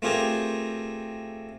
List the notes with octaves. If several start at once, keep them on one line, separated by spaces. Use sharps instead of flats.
A3 C4 F4 G4 G#4 A#4